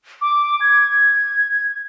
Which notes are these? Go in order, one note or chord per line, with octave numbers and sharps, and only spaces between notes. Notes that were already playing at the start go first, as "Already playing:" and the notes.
D6
G#6